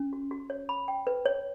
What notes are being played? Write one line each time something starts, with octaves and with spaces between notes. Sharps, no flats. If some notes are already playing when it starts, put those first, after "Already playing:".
Already playing: C#4
F#4
F#4
C#5
B5
G5
B4
C#5